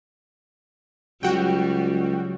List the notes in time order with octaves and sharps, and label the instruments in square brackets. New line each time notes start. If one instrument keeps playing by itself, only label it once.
[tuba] C#2 [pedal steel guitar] F#3 [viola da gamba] G3 [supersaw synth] F#4 G5